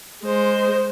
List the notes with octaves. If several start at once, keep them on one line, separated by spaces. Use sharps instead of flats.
G#3 C5